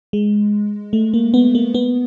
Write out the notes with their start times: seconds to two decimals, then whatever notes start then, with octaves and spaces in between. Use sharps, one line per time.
0.13 G#3
0.93 A3
1.14 A#3
1.34 B3
1.55 A#3
1.74 B3